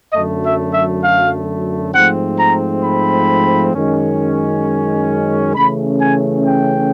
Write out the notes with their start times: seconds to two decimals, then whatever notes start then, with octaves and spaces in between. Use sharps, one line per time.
0.13 F#2 D3 F#3 A3 D#5
0.43 E5
0.73 E5
1.03 F5
1.93 G#2 F3 A3 C4 F#5
2.39 A#5
2.84 B5
3.74 F#2 D#3 G#3 C#4
5.54 C#3 E3 A3 C#4 B5
5.99 G#5
6.44 G5